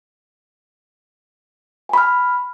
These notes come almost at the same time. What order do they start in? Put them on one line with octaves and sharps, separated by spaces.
G#5 B5 F6